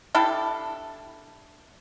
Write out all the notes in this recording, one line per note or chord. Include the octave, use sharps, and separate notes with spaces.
D4 E4 G4 A4